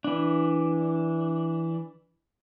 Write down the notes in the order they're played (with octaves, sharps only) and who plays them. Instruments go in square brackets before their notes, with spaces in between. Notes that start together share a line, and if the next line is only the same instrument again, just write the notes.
[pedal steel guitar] E3 D4